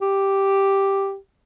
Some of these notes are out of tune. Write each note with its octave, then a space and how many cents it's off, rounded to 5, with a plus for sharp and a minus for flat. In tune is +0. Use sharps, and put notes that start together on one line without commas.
G4 +0